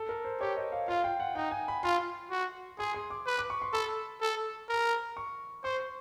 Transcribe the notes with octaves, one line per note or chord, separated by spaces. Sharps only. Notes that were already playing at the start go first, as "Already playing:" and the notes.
Already playing: A4
A#4
C5
G4 C#5
D#5
F5
F4 F5
G5
F#5
D#4 G5
G#5
B5
F4 C6
F#4
G#4 C6
C6
D6
B4
D6
C#6
C6
A4 B5
A4
A#4
C#6
C5 C#6